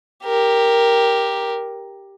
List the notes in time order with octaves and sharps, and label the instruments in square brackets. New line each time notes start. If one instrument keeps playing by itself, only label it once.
[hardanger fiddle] G4 A#4